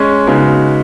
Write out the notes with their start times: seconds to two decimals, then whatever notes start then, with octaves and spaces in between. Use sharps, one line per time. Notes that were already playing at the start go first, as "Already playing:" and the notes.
Already playing: G#3 C#4 G#4 C#5
0.27 C#3 G#3 B3 D#4 F#4